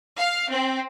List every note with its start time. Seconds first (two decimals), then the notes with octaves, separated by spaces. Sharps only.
0.16 F5
0.49 C4